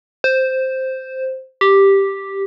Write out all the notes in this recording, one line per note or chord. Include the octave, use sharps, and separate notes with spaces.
C5
G4